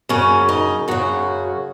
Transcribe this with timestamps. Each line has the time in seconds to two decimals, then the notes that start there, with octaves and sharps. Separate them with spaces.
0.09 F#2 C#3 C#4
0.49 D#4
0.88 F#2 C#3 F#4